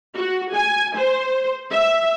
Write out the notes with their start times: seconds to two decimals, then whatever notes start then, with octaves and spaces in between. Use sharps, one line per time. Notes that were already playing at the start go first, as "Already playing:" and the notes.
0.15 F#4
0.54 G#5
0.96 C5
1.73 E5